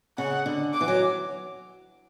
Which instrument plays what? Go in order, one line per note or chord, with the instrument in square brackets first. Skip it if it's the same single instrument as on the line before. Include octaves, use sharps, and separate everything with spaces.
[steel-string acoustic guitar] C#3 [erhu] F#5
[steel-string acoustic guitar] D3
[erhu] D6
[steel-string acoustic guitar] E3
F#3